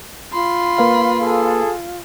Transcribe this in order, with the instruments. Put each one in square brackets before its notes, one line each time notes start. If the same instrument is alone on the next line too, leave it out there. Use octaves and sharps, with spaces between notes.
[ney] F4 [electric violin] B5 C6
[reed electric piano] A#3 B4 F5
[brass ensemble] G#4 A4